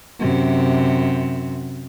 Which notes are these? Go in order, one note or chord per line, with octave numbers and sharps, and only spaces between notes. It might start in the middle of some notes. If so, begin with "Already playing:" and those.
F#2 C3